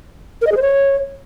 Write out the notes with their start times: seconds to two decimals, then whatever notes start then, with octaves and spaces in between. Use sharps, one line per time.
0.41 A#4
0.47 D#5
0.52 G#4
0.57 C5
0.62 C#5